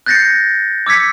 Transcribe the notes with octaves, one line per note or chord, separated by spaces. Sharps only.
F#6 G6 A6 A#6 C7 C#7
D6 E6 G#6 B6 C#7